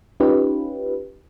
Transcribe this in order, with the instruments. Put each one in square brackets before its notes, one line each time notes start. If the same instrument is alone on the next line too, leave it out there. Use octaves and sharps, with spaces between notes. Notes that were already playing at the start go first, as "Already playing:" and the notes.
[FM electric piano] C#4 D#4 F4 G4 B4